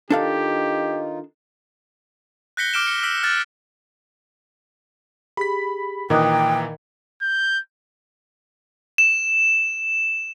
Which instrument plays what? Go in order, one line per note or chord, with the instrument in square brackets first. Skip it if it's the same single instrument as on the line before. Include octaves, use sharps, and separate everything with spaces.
[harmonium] D#3 D#4 F4 [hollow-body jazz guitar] D4 A4 F5 [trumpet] G4
[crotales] F#6 G6 A#6 B6 C#7 G7
D6 F6 D7 E7 G7
C#7
E6 F6 B6 D7
F6 F#6 A6
[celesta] G4 G#4 [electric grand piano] B5 B6
[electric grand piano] A#2 E3 A#5 [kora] D#3 [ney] G5 [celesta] D6 D#6 F#6
[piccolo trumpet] G6
[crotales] E7